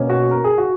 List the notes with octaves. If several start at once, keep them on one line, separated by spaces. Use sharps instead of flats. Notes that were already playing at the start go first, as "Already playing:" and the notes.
Already playing: B2 A#3 C#4
F#4
A#4
G#4
F#4